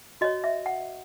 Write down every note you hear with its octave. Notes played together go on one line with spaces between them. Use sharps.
F#4 C#5 D#5
E5
F#5